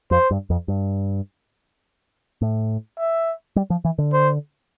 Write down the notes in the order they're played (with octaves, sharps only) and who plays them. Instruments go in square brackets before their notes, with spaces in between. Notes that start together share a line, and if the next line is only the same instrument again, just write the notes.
[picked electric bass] F2 [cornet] C5
[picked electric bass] G2
F2
G2
A2
[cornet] E5
[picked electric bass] G3
F3
E3
D3
[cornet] C5